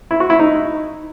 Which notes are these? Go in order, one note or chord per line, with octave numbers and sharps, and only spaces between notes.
E4
F#4
E4
D#4